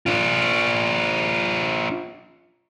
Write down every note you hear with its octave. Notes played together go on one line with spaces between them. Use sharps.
D4 F4